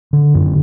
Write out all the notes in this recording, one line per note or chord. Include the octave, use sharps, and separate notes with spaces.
D3
F#2